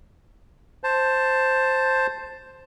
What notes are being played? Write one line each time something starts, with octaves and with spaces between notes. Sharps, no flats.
C5 A5